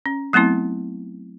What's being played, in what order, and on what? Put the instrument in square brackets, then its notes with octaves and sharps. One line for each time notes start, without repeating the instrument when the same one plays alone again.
[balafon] C#4
F#3 A3 B3 C4 E4